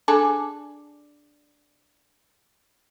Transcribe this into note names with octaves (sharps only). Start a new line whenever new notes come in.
D4 G#4 A4